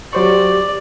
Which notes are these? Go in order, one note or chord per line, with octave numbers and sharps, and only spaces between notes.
F#3 G4 C5 D5 C#6